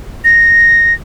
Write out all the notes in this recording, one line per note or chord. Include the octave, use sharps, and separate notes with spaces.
A#6